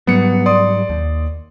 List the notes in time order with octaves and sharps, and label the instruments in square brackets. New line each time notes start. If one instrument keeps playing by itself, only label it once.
[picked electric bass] G#2 F#3 G3 [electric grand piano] B3 C#7
[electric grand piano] D5 C6 D#6
[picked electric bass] D#2